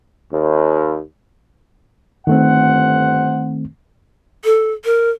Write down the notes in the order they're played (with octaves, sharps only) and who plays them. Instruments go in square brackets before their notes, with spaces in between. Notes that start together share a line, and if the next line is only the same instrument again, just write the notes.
[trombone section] D#2
[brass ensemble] G1 C5 F#5 [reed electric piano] D#3 A3 C4
[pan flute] A4
A#4